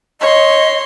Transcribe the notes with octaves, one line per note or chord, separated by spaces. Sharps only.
C#5 D#5 C6